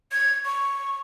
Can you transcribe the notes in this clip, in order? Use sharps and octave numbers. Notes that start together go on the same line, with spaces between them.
G#6
C#6